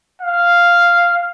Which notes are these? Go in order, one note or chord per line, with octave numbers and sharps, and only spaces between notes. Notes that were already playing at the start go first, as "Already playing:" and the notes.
F5